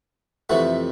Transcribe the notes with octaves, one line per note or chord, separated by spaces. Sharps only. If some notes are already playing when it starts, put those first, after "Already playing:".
F2 C3 E3 A3 F#4